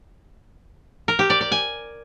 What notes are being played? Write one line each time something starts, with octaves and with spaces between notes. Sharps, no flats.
A#4
G4
D5
D5
G#5